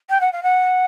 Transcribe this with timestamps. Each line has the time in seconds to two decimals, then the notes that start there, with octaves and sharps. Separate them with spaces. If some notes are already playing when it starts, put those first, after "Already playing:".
0.10 G5
0.20 F#5
0.32 F5
0.43 F#5